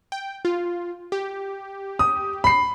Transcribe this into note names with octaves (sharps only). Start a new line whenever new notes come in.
G5
F4
G4
D#6
B5 C7